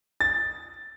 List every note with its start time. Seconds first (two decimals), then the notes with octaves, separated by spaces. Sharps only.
0.21 A6